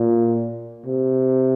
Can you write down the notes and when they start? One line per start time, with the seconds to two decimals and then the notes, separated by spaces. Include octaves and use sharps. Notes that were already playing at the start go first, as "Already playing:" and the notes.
Already playing: A#2
0.86 C3